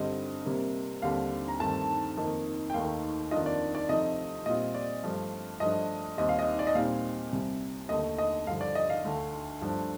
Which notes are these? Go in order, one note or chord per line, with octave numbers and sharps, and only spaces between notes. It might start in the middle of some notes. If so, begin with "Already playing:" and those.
Already playing: G2 D3 G3 C4 D#5
C3 G3 A#3
D#2 D3 G3 C4 F5
A#5
G2 D#3 A3 C4 A5
F2 D#3 A#3 D#4
G5
D#2 D#3 A3 D#4 F5
F2 D#3 A#3 D4 F4 D#5
D5
D5
C3 F3 A3 D#4 D#5
A#2 G3 C4 F4 D#5
D5
G2 F3 A3
G2 F3 A3 D4 D#5
D#2 D#3 G3 C4 D#5
F5
D#5
D5
D#5
A#2 G3 C4 D#4 F5
C2 C3 G3
D#2 D3 A3 D#5
D#5
G2 D3 F3 F5
D5
D#5
F5
D2 D3 A3
G2 F3 A3 D4